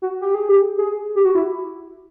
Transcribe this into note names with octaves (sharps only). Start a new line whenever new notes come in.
F#4
G4
G#4
G4
G#4
G4
F#4
E4